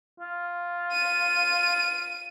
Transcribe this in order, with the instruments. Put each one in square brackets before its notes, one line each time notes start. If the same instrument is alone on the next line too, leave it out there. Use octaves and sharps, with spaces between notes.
[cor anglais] F4
[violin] D#7